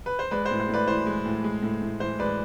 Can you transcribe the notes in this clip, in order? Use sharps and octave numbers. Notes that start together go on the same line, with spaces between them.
B4
C5
G#3 B4 D5
C5
A2
C5
A2 B4 D5
E3 C5
G#3
A2
G#3
A2
A2
E3 C5
G#3 B4 D5